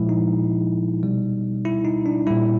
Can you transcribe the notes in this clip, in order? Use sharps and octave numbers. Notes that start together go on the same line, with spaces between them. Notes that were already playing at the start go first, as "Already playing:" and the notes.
Already playing: A#2 F3 G#3 E4
D#4
B2 G3
E4
D#4
D4
A#2 G3 E4